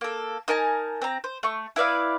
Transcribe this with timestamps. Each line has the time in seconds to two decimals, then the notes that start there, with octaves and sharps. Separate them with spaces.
0.01 A#3 A4
0.48 D#4 A#4 G#5 A5
1.02 C4 A#5
1.24 C5
1.43 A3 C#6
1.76 E4 B4 D5 F5